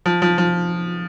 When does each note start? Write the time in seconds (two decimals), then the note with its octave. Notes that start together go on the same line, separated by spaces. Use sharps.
0.06 F3
0.22 F3
0.38 F3